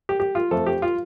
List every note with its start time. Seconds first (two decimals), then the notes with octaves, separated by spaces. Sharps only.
0.09 G4
0.20 G4
0.35 F4
0.51 F2 F3 A3 A4
0.66 G4
0.82 F4